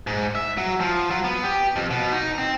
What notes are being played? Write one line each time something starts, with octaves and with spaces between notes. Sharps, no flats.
G#2
E5
F#3
F3
F#3
B3
G4
F2
B2
D#4
C4